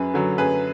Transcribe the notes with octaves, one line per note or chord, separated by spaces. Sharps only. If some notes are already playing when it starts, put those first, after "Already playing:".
Already playing: F#2 G#4 B4
D3 F#3
F#2 G#4 B4